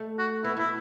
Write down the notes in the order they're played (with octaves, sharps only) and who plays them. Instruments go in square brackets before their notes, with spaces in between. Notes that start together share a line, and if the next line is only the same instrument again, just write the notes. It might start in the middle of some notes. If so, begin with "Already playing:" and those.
Already playing: [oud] A3
[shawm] F#4
[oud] B3 [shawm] E4
[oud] A3 [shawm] E4